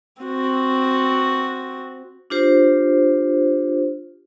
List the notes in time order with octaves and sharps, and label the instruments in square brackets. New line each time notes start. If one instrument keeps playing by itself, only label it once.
[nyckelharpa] C4 F#4
[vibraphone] D4 F4 G4 C5